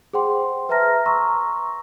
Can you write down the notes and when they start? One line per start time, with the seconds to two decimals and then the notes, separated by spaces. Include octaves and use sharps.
0.13 G#4 C5 F#5 G5 C6
0.69 B4 E5 A5 A#5 F6 A#6
1.06 A#5 C6 C#6 E6